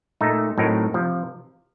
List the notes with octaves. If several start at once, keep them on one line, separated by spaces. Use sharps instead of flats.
A#2 A3 D#4 A4
A2 F#3 C4 D#4 A#4
C3 F3